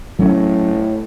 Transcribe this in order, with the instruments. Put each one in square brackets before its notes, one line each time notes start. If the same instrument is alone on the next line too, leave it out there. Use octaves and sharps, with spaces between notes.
[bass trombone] A2 [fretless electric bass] F#3 C#4